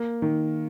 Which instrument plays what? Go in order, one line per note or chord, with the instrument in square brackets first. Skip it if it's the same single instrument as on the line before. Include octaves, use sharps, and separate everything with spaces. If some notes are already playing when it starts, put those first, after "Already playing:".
Already playing: [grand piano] A#3
D#3